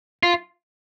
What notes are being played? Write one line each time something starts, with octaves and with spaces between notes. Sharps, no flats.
F4